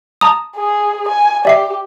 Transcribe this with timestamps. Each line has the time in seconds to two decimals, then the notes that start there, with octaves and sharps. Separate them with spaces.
0.21 A5 A#5 D#6
0.56 G#4
1.08 G#5
1.45 G4 D5 E5 C7